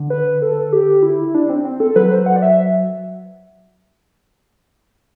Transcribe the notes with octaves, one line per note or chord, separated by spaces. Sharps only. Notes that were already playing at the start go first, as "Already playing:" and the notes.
Already playing: D3
B4
A4
G4
E4
D4
C4
C4
A4
F#3 B4
C5
F#5
D5
E5